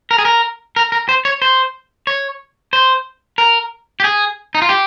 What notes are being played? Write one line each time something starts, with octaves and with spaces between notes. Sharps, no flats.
A#4
G#4
A#4
A#4
A#4
C5
C#5
C5
C#5
C5
A#4
G4
G#4
D#4
F4
G4